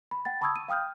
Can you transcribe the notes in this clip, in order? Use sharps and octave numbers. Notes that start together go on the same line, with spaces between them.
B5
F#5 G5 A6
A5 B5 C#6 D#6 E6 G#6
D#7
F5 G5 D#6 F6 G6